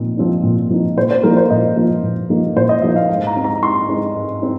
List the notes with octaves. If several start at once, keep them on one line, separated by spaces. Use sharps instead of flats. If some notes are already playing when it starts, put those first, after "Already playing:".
Already playing: A#2 F3 C4 D#4
F3 C4 D#4
A#2
F3 C4 D#4
A#2 C5
C5
F3 A#3 D#4 A#4
C5
A#2 D#5
F3 A#3 D#4
A#2
F3 A#3 D#4
A#2 C5
D#5
F3 A#3 D#4 D#5
F5
G#2 F5
A#5
G#3 C4 D#4
A#5
G#2 C6
G#3 C4 D#4
G#2
C4 D#4